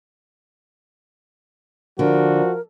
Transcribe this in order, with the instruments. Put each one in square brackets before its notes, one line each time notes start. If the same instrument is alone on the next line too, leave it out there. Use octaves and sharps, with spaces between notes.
[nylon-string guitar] D3 [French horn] F3 [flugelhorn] F#4 [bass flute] A#4